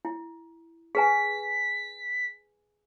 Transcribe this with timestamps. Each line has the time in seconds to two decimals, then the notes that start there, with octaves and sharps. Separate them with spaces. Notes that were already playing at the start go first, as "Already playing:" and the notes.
0.05 E4
0.95 G#4 B4 G#5 B6